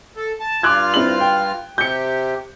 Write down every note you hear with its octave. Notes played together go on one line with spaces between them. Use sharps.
A4
A5
G2 F4 D6 F6 F#6 G#6
C4 E4 F#7
G5
C3 G4 G6 C#7